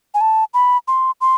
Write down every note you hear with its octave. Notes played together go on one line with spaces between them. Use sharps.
G#5
A5
B5
C6
C6